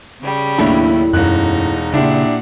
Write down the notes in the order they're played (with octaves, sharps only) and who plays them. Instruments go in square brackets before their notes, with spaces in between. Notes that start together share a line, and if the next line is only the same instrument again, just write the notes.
[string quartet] C#3 G3
[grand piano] D#2 E4 [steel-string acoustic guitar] A2 F#3 [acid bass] D4
[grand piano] E1 F#6 [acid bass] F#2 [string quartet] D#4
[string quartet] A#2 F#5 [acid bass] C#3 [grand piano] D4 E4 G4